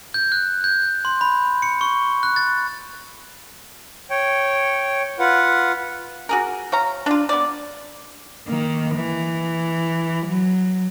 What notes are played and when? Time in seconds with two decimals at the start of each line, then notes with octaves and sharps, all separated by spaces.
0.14 G6
0.32 F#6
0.64 G6
1.05 C6
1.21 B5
1.62 C#7
1.81 C#6
2.23 F#6
2.36 A6
4.10 C#5 G5
5.19 F4 B4 F#5
6.29 F#4 G#4 A#4
6.72 C#5 F5 A#5
7.06 D4 F4
7.29 B3 D5
8.47 D#3 A#3
8.95 E3
10.27 F#3